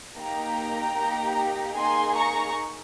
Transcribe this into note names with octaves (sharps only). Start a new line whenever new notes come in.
A#3 D#4 G4 G5 A#5
A#3 D#4 G4
A#3 D#4 G#4 G#5 C6
A#5 C#6